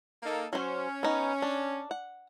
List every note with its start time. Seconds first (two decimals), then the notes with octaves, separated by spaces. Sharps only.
0.23 A#3 D#4 A4
0.53 F#3 C#4 C5
1.03 B3 D#4
1.42 D4
1.91 F#5